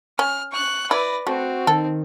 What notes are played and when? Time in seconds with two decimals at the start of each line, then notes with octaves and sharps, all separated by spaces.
0.19 C#4 F6
0.52 C#6 F#6
0.91 E4 B4 D5 A#6
1.27 A3 C4 F#4
1.67 D#3 A4